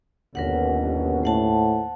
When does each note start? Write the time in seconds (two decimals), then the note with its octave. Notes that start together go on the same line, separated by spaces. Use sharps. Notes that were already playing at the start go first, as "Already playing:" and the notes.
0.35 G1 D#2 B2 C#4 A#4 B4 F#5
1.24 A2 C5 F#5 A5